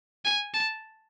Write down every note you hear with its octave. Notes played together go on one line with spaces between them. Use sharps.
G#5
A5